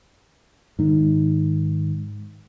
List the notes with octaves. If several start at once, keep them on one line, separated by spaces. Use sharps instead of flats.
G#2 D#3